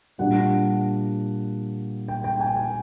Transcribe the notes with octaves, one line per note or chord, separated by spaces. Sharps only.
A#2 G3 A#3 D4 F#5
G5
G5
G#5
G5